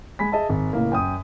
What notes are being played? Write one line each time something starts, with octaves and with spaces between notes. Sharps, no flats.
G#3 G#5 B5 B6
G#4 D#5 E5 A5
G#1
C#2 A2 A#3
F#2 G5 D#6